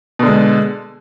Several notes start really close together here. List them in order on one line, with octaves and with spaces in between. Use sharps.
B2 D3 G#3